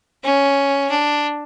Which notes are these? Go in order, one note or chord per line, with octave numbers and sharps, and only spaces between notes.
C#4
D4